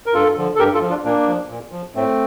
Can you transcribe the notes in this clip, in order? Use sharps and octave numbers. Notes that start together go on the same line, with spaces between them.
A#4
G2 F4 A4
D3 F3
A4
G2 G4 A#4
F4 A4
F3
D4 F4
A#2 A#3 D4
F3
A#2
F3
A2 A3 C4